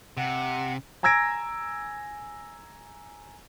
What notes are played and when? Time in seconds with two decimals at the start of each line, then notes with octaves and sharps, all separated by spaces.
0.17 C3 F#5
1.03 G#5 A#5 E6 G#6 A#6 D7